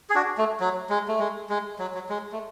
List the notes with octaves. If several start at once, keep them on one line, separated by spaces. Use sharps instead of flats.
G#4
D4 F#4
A3
F#3
G#3
A3
G#3
G#3
F#3
F#3
G#3
A3